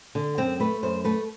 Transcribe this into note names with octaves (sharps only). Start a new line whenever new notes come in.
D3
F#2 C4
A3 B4
F#2 C5
A3 B4